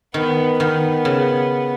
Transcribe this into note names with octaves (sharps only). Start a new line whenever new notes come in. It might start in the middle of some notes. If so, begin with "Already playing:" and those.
D#3 B3
D#3 B3
C#3